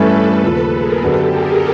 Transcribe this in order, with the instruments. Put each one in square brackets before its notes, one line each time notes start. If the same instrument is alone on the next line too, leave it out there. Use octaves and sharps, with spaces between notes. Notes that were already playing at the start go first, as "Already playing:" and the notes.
Already playing: [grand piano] G2 E3 A3 C#4 [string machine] A4 B4
[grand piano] D#2 C#3 F3 [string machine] A4 B4
[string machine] G#4 A#4
[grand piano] F#2 D3 F#3 B3 [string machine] G4 A4
[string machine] G#4 A#4